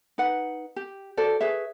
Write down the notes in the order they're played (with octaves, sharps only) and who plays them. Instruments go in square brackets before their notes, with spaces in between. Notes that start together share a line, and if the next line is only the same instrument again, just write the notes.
[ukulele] D#4 B4 F#5
G4
F#4 A4 C5 D5
G#4 B4 C#5 E5